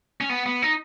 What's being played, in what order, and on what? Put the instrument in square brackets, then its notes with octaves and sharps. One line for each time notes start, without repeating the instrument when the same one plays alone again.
[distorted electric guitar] C#4
B3
B3
D#4